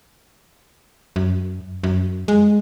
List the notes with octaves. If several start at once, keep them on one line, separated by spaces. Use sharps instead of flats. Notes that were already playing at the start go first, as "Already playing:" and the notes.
F#2
F#2
G#3